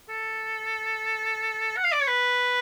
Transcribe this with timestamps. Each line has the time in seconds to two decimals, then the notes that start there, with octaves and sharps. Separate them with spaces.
0.09 A4
1.77 F#5
1.84 F5
1.92 D5
2.01 C#5
2.08 B4